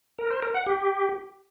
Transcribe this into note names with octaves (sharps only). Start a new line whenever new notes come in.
A#4
C5
A#4
F#5
G4